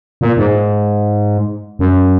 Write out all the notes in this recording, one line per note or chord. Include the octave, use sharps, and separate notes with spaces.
A#2
G#2
F#2